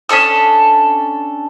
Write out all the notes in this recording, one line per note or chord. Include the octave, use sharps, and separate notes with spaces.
C#4 D4 A4 D#6